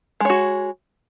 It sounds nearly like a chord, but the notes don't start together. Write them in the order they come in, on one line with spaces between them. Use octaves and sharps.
G#3 C#5 F#4